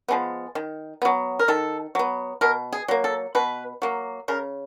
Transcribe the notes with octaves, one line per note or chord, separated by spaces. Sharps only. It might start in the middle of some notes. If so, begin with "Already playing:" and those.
F3 G#3 B3
D#3
F#3 B3
A#4
D#3 A4
F#3 B3
B2 A#4
G#4
F#3 A#3
A4
B2 B4
F#3 A#3
C#3 A#4